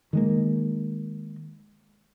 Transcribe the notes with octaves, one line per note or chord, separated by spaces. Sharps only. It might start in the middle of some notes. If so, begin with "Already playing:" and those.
D#3 G#3 A#3